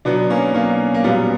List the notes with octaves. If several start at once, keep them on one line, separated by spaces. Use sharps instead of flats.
B2 F#3 B3 D4
A#3 C#4
A#3 C#4
A#3
A#2 F#3 G3 B3